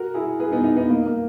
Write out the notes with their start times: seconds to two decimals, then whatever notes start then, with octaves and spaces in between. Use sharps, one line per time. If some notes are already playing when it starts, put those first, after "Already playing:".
Already playing: F#4 A#4
0.14 E4 G#4
0.40 G#4 B4
0.51 B3 D#4
0.64 B3 D#4
0.76 B3 D#4
0.89 A#3
1.06 A#3